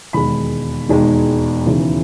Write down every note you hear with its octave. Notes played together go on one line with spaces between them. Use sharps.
E1 D#2 D#3 G#3 B5
E1 D#2 D#3 G#3
E1 D#2 C#3 E3